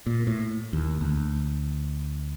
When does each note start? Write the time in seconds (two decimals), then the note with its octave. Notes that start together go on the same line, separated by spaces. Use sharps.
0.06 A#2
0.27 A2
0.73 D#2
1.01 D2